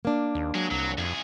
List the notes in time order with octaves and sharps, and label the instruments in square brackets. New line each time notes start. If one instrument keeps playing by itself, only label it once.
[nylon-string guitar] A#3 D4
[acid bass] D#2
[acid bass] F#3 [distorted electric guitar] G#3
[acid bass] C2 [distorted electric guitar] F#3
[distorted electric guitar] C2 G#4 [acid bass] F2